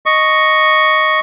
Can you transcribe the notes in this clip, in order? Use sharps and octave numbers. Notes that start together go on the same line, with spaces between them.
D#5 C#6